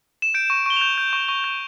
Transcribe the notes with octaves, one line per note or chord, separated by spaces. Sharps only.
E7
G6 D7
C#6
C#6 G7
F7
G6
G6
C#6
C#6
G6